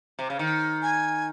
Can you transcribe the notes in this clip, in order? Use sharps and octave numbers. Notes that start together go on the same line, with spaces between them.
C3
C#3
D#3
G#5